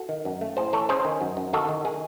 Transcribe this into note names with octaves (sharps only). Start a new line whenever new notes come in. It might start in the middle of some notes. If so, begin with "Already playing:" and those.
Already playing: F#4 A4
D#3
F#2
A3
A2 G#4 C5
E3 A4 C#5
C#4 G#4 C5
D#3
F#2
F#2
D#3 F#4 A4
D#3
D#3 G#4